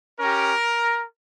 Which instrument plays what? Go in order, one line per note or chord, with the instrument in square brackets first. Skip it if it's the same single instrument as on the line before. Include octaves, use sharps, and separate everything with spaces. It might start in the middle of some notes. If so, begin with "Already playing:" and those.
[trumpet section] C#4 G4 A#4